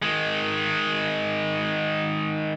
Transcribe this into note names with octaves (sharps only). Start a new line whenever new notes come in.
D#3 G#3